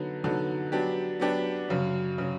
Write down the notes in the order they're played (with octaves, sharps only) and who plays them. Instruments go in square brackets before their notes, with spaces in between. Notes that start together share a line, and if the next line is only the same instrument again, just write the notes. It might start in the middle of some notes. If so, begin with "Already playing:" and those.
Already playing: [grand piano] D3 F#3 B3 D#4
D3 F#3 B3 D#4
F#3 B3 D4 G4
F#3 B3 D4 G4
F#2 C#3 F#3
C#3 F#3